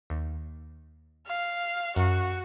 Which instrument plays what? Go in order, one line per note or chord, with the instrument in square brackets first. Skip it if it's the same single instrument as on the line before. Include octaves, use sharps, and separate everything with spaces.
[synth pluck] D#2
[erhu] F5
[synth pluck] F#2 C#7 [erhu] F#4